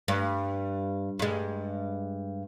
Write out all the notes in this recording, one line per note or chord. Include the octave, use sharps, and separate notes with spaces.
G2
G2 G#3